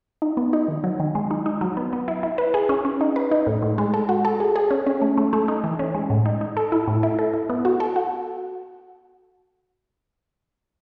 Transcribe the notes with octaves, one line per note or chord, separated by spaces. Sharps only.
D#4
B3
D#4
D#3
F#3
D#3
G#3
D#4
D#4
F#3
B3
B3
E4
E4
B4
G#4
C#4
C#4
D#4
B4
D#4
A2
A2
G#3
A4
F#4
A4
G#4
G#4
C#4
C#4
A3
A3
A3
D#4
E3
C#4
G#3
A2
D#4
D#4
A4
E4
A2
E4
A4
E4
B3
F#4
A4
F#4